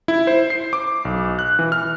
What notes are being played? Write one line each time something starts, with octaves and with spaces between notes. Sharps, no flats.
E4
C5
C7
D6
B1
F#6
E3
F6